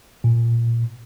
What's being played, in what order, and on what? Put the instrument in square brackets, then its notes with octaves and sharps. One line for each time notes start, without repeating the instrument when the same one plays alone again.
[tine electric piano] A#2